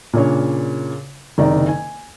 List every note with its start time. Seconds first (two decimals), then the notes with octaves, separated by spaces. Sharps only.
0.13 A#2 C#3 D4 C#5
1.38 F#1 C3 D#3 D5 A#5
1.68 G#5